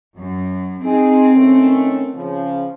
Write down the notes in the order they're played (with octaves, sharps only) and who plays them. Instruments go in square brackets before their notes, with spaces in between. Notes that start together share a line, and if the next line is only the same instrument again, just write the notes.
[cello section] F#2
[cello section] C4 [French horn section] D#4 G#4
[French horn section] D#3 A3 C#4
C#3 F3